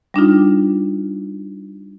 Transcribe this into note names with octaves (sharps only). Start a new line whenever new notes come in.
G3 D4 D#4 F4